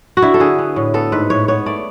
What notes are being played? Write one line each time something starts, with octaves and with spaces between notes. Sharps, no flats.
F#4
D3 E4
A4
D3 G#4
B3
A2
B3 A4
G#2 B4
A2 C#5
B3 C#5
A3 D5